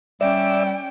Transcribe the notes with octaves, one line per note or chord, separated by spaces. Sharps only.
G3 C#4 D5 E5 G5